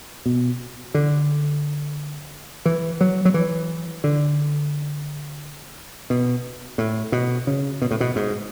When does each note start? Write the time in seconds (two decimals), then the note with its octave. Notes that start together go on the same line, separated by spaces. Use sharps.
0.26 B2
0.94 D3
2.66 E3
3.01 F#3
3.25 F#3
3.34 E3
4.04 D3
6.10 B2
6.78 A2
7.12 B2
7.47 C#3
7.82 B2
7.91 A2
8.00 B2
8.16 G#2